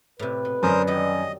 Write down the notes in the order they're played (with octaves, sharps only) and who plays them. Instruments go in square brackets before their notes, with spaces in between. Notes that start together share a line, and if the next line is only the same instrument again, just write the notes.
[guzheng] A2 C3 [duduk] B4
[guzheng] B2
[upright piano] F#2 [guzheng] D3 F3 D#4 [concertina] A#4 C5 D#6
[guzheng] D#3 F#3 G3 [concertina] D#5